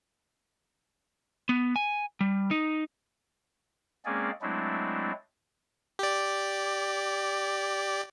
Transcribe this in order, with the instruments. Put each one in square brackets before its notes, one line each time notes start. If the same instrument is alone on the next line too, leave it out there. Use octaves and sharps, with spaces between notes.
[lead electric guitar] B3
G#5
G3
D#4
[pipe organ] G#3 A#3 C4 C#4 G#4 D5
F#3 G#3 A3 C4 D4 E4
[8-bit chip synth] G4 D5